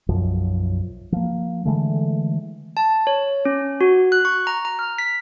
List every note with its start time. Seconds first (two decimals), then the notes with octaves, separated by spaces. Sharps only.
0.09 B1 F#2 F3
1.12 F3 A#3
1.65 D3 E3 G#3 A3
2.77 A5
3.07 C#5
3.45 C#4
3.81 F#4
4.12 F#6
4.25 C#6
4.47 A#5
4.65 A#5
4.79 F6
4.98 B6